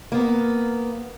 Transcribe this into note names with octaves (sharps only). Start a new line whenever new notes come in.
A#3 B3